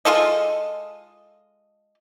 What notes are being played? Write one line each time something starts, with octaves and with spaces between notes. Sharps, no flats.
G#3 F4 A4 D#5